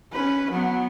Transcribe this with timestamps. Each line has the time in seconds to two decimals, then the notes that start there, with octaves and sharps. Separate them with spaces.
0.13 C#4 B4
0.51 F#3 B3